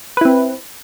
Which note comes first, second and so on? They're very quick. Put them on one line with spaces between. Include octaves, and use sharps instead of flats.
B4 E4 C4